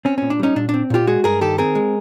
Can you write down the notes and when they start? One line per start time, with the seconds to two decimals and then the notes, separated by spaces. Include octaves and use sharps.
0.05 C4 C#4
0.18 A#2 C#4
0.30 D4
0.39 G3 C#4 D#4
0.56 A#2 D4
0.69 C4 D4
0.90 A#2 F4 G4
1.07 G#3 F#4 G#4
1.24 G2 G#4 A#4
1.41 D#3 G4 A4
1.58 C4 G#4 A#4
1.75 G#3